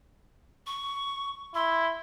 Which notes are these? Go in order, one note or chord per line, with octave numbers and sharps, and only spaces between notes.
C#6
E4 C6